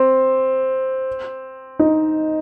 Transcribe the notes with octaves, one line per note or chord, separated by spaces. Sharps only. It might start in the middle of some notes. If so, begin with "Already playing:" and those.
Already playing: C4
D#4